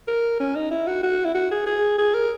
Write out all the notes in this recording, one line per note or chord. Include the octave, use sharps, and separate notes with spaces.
A#4
C#4
D#4
E4
F#4
F#4
E4
F#4
G#4
G#4
G#4
A#4